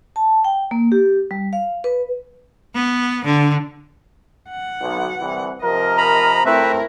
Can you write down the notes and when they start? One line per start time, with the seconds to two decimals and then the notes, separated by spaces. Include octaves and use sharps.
0.16 A5
0.45 G5
0.71 A#3
0.92 G4
1.31 G3
1.53 F5
1.84 B4
2.75 B3
3.24 D3
4.49 F#5
4.82 B1
5.20 C2 E3
5.63 C3 F3 A#4 D#5
5.97 A#5 B5
6.46 G#1 A3 C4 E4 A#4 B4 E5